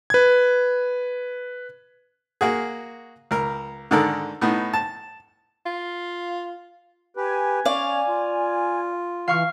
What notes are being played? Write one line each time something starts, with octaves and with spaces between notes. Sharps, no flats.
B4 G#6
A#3 F#4 G#4
C#2 A#4
G#2 D3 D#3 A4 A#4
A2 B3 D#4
A5
F4
G4 B4 G#5
C#4 D5 F5
F4
E3 F5 C#6 F6